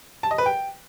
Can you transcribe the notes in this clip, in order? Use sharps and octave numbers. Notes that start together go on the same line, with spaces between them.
A5
D#5
B4
G5